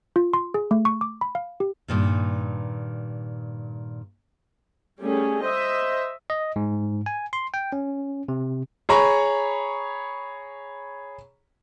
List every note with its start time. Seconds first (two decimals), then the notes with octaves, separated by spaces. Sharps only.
0.16 F4
0.34 C6
0.54 G#4
0.71 A3
0.85 C#6
1.01 D6
1.21 B5
1.35 F5
1.60 G4
1.88 G2 A#2 D#3
5.01 G3 A3 C#4 G#4
5.42 C5 D#5 E5
6.30 D#5
6.56 G#2
7.06 G#5
7.33 C6
7.54 G5
7.73 C#4
8.28 C3
8.89 G#4 C#5 A#5 B5 C#6